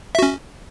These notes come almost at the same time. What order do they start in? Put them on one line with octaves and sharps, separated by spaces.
E5 F#4 C#4